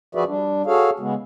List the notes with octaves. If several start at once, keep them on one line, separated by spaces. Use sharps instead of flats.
F3 F#4 G#4 B4 D5 E5
G3 D4
F#4 G#4 A4 C#5 F5
C#3 G#3 B3